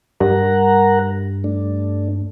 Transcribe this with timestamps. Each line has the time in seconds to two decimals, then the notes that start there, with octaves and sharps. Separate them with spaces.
0.20 G2 A#4 F#5 A#5
1.44 A3 D4